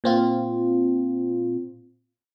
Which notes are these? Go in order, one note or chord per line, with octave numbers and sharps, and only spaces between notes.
A#2 C4 F4